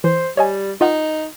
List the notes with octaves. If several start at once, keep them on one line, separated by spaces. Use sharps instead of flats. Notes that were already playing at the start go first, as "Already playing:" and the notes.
E3 C5
G3 C#5 D#5 G#5
D#4 F4 D#5 F#5